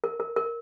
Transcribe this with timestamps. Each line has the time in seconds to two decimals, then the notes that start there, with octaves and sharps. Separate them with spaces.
0.04 A#4
0.20 A#4
0.36 A#4